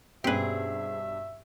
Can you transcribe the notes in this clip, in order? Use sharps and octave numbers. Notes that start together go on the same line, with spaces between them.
G2 B2 C4 C#4 G4 G#4 B4 E5